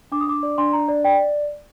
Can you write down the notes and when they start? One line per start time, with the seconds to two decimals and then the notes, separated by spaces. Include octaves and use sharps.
0.12 D4 D6
0.21 D#6
0.27 D4 D6
0.43 D5
0.58 D4 C6
0.73 D4 A#5
0.89 D5
1.04 D5 G5